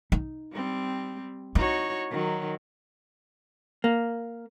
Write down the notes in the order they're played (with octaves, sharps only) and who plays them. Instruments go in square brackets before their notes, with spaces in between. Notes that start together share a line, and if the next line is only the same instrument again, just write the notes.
[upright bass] D#4
[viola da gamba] G3 C4
[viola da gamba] D#4 F#4 C#5 [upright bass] E4
[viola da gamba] D#3 F#3
[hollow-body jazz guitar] A#3